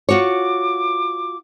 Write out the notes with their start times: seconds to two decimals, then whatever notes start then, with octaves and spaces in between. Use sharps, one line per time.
0.09 F4 F#4 C#5 D6